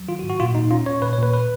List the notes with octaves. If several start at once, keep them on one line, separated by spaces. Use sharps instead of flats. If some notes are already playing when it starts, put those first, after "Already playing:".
Already playing: F#3
D#3 F4
F#4
G#2
F#4
A#2 F4
A#2 D#4
C#4 F4
C#4 C#5
A#2 B4
C#5
A#2 B4
B4